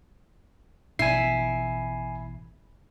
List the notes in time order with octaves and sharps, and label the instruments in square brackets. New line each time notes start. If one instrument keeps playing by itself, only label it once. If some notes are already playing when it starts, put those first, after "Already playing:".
[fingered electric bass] A1 B2 [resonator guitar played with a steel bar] E4 [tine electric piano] G#5 C7